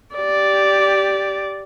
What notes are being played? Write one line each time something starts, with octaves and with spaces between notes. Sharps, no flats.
G4 D5